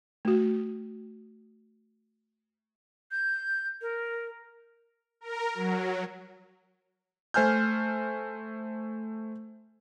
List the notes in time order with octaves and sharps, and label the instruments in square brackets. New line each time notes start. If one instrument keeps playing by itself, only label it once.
[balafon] A3 F#4
[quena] G6
A#4
[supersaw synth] A#4
F#3
[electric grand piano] A3 C5 G#5 F6 G6